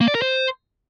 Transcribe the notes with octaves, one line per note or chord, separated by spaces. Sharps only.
A#3
D5
A#4
C5